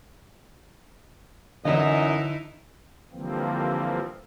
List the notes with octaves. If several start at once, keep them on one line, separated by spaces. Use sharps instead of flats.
F#2 D3 E3 D#4 E4 D#5
D3 E3 F3 G3 A#3 C4